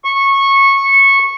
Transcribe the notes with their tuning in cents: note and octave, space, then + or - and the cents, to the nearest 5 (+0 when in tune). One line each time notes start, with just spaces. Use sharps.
C#6 -15